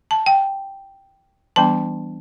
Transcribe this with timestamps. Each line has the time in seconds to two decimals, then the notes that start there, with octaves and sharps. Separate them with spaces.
0.11 A5
0.26 G5
1.56 E3 G3 B3 D4 A5